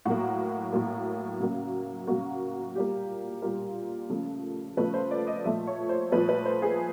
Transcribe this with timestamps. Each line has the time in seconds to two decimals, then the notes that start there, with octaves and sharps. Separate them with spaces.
0.05 A2 F#3 A#3 F#4
0.73 A2 F#3 A#3
1.40 C#3 F#3 A#3
2.07 C#3 F#3 A#3 F#4
2.75 A#2 G3 A#3 G4
3.42 A#2 G3 A#3 A#4
4.10 C#3 F3 A3
4.77 C#3 F3 A3 B4
4.94 C5
5.11 D5
5.27 D#5
5.44 A#2 F3 A3 E5
5.67 C#5
5.89 C5
6.12 A#2 F3 A3 B4
6.29 B4
6.45 C5
6.62 G#4